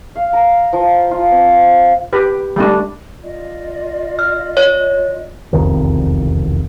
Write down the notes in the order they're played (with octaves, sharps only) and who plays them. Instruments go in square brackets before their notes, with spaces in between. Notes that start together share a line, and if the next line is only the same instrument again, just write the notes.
[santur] F5
A#5
F3
F4
C4
[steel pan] G4 B4
G3 A3 D4
[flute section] F4 D5 D#5
[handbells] F6
C#5
[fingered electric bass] E1 C2 F2 D#3